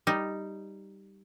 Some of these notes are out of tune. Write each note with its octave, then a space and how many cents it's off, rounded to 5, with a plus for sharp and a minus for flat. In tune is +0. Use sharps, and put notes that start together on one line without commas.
G3 +0 D#4 +0